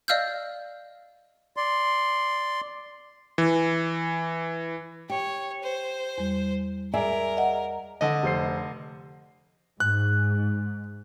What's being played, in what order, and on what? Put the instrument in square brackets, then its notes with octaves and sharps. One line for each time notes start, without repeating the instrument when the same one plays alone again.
[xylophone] D5 D#5 F5 E6 F6 G6
[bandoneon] D5 C6
[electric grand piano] E3
[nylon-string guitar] G4 [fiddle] C#5
[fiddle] C5
[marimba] E2 G3
[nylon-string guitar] G#4 D5 E5 [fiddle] A#4
[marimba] D#5 F#5
[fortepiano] D3 D#5
[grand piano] F1 C5 C7
[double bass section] G#2 [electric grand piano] F#6